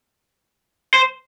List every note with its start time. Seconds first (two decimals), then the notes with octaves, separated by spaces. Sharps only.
0.94 C5